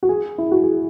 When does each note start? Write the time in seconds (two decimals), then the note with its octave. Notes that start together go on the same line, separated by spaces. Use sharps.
0.03 F#4
0.09 G#4
0.38 E4
0.51 F#4
0.64 G#4